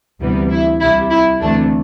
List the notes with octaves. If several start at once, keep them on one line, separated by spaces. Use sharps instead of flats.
D2 C3 E3 G3 B3
E4
C2 C3 G3 E4
E4
D2 C3 E3 A3 D4